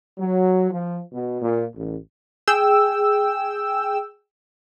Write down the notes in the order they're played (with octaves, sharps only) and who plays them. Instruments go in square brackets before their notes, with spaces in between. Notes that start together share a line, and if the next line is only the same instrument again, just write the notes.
[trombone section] F#3
F3
B2
A#2
A1
[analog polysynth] G#4 G5 E6